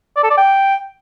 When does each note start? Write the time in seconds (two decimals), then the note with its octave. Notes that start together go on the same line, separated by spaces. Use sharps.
0.16 D5
0.23 A4
0.30 D5
0.37 G5